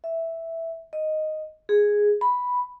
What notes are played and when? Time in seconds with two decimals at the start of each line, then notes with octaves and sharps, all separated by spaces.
0.04 E5
0.93 D#5
1.69 G#4
2.21 B5